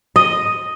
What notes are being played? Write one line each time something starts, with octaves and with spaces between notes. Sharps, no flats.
D#5